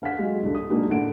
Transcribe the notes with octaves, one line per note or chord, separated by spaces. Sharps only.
D3 F5 F#5 B6
F#3 G#3
C2 D3
D#6
A#2 F#3 G#3 A#3 D4 D#4
A2 D3 F#5 D7